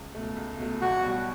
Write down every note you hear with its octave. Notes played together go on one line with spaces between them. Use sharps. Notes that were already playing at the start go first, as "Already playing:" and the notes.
Already playing: C#2
B2 A3
C#2
B2 A3
B1 F#4
B2 G3